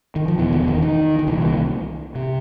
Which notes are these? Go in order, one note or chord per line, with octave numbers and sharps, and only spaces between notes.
D#3
F3
E1 E2 B2 E3
D#3
D3
D#3
D#3
D#3
C2 A#2 E3
D#3
C3